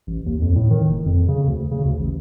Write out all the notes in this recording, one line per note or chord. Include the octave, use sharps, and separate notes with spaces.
A1
D#2
F2
A2
D#3
F#1
F2
C#3
D2
C#3
D2
A1